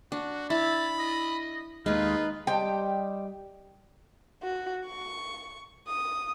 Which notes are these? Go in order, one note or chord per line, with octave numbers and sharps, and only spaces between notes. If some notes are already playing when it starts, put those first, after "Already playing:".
D4 F#4
E4 A5 B5
D#5
D#2 G#3 D#4 F4 B4
G3 D#4 G4 C5 G5
F#4
C#6
D#6